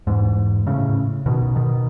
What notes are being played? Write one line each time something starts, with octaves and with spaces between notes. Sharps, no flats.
E2 G#2
A2 C#3
B2 D#3
B2 D#3